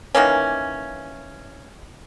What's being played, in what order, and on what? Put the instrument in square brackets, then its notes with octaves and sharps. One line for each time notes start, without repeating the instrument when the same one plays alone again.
[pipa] D#3 E3 A#3 C#4